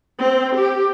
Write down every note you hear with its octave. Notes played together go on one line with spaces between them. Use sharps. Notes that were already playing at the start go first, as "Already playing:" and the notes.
C4
G4